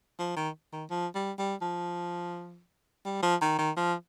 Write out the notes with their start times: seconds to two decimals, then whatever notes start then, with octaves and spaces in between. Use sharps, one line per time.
0.19 F3
0.36 D#3
0.73 D#3
0.90 F3
1.15 G3
1.39 G3
1.62 F3
3.05 G3
3.23 F3
3.41 D#3
3.58 D#3
3.77 F3